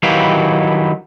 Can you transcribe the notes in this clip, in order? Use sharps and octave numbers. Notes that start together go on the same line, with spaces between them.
D#3 F#3 E4 G4 B4 F5